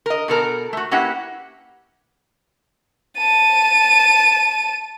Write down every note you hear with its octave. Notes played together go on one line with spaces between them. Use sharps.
A#4 D#5
B2 A4 A#4
A3 F#4
A#3 C#4 E4 G4 B4 F#5
A5 D#7